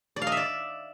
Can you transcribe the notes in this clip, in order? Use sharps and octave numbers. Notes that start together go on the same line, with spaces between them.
D5
F5
D#5
E5
D5